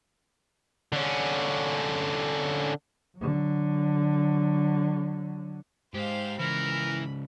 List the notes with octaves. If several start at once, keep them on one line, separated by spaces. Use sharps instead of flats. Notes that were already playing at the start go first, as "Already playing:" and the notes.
D3 C#4
D3 F#3
G#2 G4 C5 F5
G#2 C#3 E3 A#4 B5